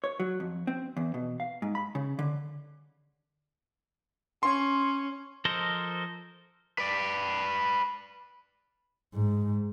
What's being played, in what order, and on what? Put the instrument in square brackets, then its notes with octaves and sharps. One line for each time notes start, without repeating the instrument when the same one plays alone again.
[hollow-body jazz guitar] C#5
F#3
F2
C4
E2
B2
F5
G#2
B5
C#3
D3
[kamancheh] C#4 [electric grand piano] C6
[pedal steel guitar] F3 A4 A#4 C5 D#5
[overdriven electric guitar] B4 D5
[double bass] G#2